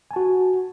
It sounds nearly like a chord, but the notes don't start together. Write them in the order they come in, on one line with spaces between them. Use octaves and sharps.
G#5 A5 F#4